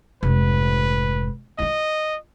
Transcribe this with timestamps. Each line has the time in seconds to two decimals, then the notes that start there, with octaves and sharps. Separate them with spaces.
0.23 F1 G#2 B4
1.59 E4 F4 D#5